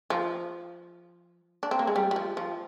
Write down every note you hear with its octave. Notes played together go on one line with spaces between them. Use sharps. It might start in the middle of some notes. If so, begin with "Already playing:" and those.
F3
D4
C4
A#3
G#3
G3
G3
F3
F3